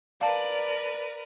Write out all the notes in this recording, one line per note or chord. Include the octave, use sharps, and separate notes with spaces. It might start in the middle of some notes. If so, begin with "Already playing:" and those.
A#4 B4 D5 F5 A5